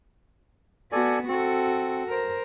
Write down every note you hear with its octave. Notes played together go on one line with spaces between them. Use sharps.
B3 F#4 A4 D5 G#5
C4 F#4 A4
A#4 C5